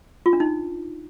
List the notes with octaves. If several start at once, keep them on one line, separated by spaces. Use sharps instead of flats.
F4
D4
D#4